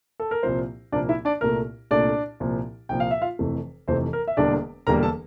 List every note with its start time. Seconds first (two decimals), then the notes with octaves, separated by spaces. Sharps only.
0.20 A4
0.31 A#4
0.43 C2 A#2 F3 A#3 C4 C5
0.92 C2 A#2 F3 A#3 D4 D5
1.09 E4 E5
1.25 D4 D5
1.41 C2 A#2 A3 A#4
1.91 C2 A#2 A3 D4 D5
2.40 C2 A#2 F3
2.89 C2 A#2 F3 G5
3.00 F5
3.11 E5
3.22 F4 F5
3.39 F1 F2 C3 E3 A3
3.88 F1 F2 C3 E3 A3 C4 C5
4.13 A#4
4.28 E5
4.37 E1 E2 D3 G3 A#3 D4 D5
4.87 E1 E2 D3 G3 A#3 A#4 A#5
5.03 A4 A5